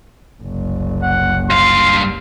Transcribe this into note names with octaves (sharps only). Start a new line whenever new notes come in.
F#1 C2
F#5
G2 F5 C6